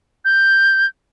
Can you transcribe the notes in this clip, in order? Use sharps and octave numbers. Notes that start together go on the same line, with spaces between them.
G6